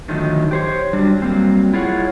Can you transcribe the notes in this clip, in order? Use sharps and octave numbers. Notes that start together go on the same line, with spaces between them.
D3 D#3 F3 F#3 A3 D#4
G4 C5 C#5
F#3 G3 D4
F#3 G3 A#3 C4
E4 F4 G#4 C#5 F#5